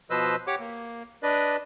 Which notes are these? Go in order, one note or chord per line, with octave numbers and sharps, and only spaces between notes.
B2 F3 B4 C5 D#5 E6
G4 C#5 F#5 D6
A#3
D4 B4 D5 D#5